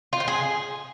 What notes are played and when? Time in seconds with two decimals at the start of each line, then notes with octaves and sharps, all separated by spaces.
0.13 F4
0.20 C5
0.28 G#4